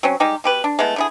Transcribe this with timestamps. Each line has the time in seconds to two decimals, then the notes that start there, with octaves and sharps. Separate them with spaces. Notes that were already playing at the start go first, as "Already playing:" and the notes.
0.03 F#3 C4 C#4
0.20 G3 G#3 D#4 G4
0.44 B2 G4 B4
0.64 D4
0.79 G#3 A3 B3 E4
0.96 D3 E4 G#4